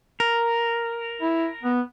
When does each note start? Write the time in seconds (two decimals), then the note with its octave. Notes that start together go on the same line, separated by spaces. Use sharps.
0.20 A#4
1.21 E4
1.63 B3